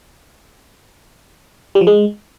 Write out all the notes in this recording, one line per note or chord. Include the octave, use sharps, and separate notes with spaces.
G3
F3
G#3